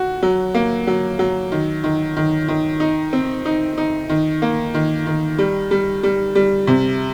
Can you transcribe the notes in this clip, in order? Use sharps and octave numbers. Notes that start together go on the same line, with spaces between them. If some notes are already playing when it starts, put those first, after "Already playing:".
Already playing: F#4
F#3
A#3
F#3
F#3
D#3
D#3
D#3
D#3
D#4
C4
D#4
D#4
D#3
A#3
D#3
D#3
G3
G3
G3
G3
C3